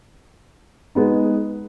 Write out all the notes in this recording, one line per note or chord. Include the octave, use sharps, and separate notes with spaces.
G#3 B3 D#4